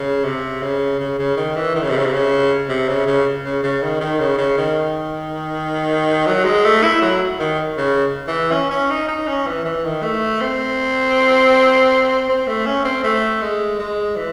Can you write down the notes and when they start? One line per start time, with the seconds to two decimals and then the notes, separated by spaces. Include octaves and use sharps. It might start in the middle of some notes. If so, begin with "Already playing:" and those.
Already playing: C#3
0.25 C3
0.62 C#3
0.99 C#3
1.19 C#3
1.37 D#3
1.56 E3
1.76 D#3
1.83 C#3
1.90 C3
1.97 C#3
2.06 C3
2.13 C#3
2.69 C3
2.88 C#3
3.06 C#3
3.44 C#3
3.63 C#3
3.82 D#3
4.01 D#3
4.20 C#3
4.38 C#3
4.58 D#3
6.26 F#3
6.45 G#3
6.64 A3
6.83 E4
7.02 F#3
7.40 D#3
7.77 C#3
8.28 E3
8.52 C#4
8.71 C#4
8.90 D#4
9.09 D#4
9.27 C#4
9.47 E3
9.65 E3
9.84 D#3
10.03 A3
10.41 C4
12.29 C4
12.47 A3
12.66 C#4
12.85 C4
13.04 A3
13.42 G#3
13.79 G#3
14.16 E3